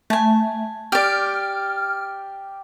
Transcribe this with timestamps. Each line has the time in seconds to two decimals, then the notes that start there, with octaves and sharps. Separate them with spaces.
0.10 A3 G#5 A5
0.92 G4 D5 F6